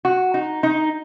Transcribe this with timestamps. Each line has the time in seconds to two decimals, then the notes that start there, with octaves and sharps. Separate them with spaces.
0.05 F#4
0.34 D#4
0.63 D#4